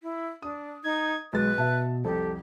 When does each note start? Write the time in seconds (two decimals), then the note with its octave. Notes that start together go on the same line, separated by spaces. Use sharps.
0.03 E4
0.42 D4 D#6
0.84 D#4 G#6
1.33 B1 G#3 B4 A6
1.58 B2 E5 A5
2.05 C2 F2 G4 A4